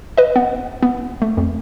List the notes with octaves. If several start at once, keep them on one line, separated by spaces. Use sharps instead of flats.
B4 D#5
B3
B3
A3
F2